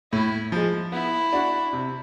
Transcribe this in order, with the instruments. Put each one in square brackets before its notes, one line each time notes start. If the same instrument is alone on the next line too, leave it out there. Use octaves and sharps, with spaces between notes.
[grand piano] A2 [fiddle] E4
[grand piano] F3 G#3
[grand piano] B3 [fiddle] E4
[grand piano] D4 F#4
C3